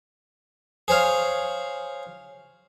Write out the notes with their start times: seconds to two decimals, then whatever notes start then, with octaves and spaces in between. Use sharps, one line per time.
0.88 G#4 C5 C#5 F5